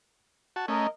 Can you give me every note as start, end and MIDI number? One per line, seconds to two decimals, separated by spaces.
0.56 0.66 66
0.56 0.66 81
0.68 0.87 57
0.68 0.87 61
0.68 0.88 70
0.68 0.88 75